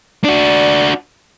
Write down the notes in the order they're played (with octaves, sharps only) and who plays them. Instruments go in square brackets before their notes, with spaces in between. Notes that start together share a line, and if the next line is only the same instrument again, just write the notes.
[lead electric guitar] D4 F#4 [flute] D5